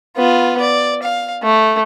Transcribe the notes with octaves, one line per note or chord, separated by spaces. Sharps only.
B3 F4
D5
F5
A3